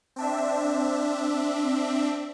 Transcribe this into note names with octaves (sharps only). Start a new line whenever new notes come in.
C4 D4 E5